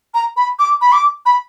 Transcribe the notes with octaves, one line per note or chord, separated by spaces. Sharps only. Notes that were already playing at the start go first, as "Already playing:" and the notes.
A#5
B5
D6
B5
D6
B5